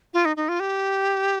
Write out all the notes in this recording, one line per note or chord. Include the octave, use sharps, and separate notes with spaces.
F4
D#4
D#4
F4
G4